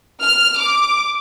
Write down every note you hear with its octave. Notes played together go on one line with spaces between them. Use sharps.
F6
D6